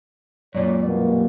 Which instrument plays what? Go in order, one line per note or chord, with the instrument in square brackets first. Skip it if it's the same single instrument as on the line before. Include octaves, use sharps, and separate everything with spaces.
[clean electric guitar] F#2 A#2 [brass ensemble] C#5 D5
[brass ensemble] B2 G3 A#3